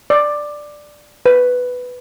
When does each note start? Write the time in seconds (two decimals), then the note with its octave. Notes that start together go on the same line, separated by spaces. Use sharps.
0.10 D5
1.26 B4